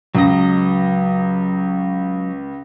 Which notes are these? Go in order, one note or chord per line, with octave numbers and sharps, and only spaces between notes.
C#2 F#3 D#5